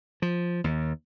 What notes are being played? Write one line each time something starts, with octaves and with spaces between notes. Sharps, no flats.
F3
D#2